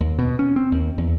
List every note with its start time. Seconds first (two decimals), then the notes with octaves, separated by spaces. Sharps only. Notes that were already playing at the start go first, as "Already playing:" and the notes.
0.01 D#2
0.19 B2
0.39 C#4
0.56 C4
0.72 D#2
0.98 E2